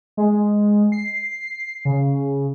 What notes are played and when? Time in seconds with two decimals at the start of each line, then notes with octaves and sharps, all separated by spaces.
0.17 G#3
0.92 C7
1.85 C#3